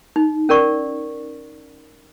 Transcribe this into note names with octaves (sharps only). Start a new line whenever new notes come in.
D#4
C#4 A#4 D5 C#6